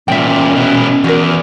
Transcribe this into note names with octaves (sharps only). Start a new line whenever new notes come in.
E2 A#2 C#4 E5 G5
B2 E3
E2 F#4 A#4